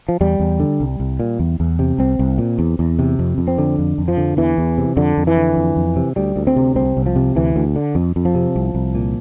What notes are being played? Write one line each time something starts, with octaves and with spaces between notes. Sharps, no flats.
F3
E2 G3
E2
D3
C2
C2
A#2
E2
E2
C3
C2 C4
C2
A#2
E2
E2
C3
F2
F2
C4
D3
F2
F2
F3
D3
E2 E3
E2
C3
F2 D3
F2
E3
D3
F2
F2
C3
D2 G3
D2
C4
C3
C2 C4
C2
F3
C3
D2 E3
D2
D3
F2
F2
F3
C3
C2
C2
A#2